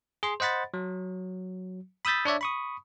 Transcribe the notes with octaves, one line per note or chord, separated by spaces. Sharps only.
G#4 C6
C5 D#5 F#5 B5 A6
F#3
B5 D#6 E6 G6 A6 B6
D4 C#5 D5 E5
B5 C#6 D#6